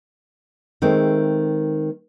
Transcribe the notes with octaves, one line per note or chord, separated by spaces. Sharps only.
D#3 G#3 A3 C4